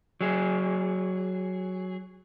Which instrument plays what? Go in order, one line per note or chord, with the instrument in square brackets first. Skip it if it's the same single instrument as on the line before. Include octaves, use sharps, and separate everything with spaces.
[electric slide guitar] F#3 G#4